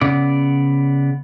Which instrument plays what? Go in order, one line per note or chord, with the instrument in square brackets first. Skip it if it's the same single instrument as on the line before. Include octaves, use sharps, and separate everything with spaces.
[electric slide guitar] C#3 B3 D5